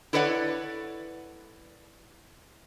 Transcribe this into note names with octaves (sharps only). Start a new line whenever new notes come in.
E4 A4 B4 C#5 D5 F#5